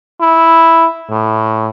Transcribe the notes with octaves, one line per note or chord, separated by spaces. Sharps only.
E4
A2